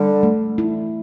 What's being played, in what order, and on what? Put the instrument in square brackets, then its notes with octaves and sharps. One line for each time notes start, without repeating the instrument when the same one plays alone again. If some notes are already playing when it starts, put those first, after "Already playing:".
Already playing: [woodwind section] D3 G3
[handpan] A3
E4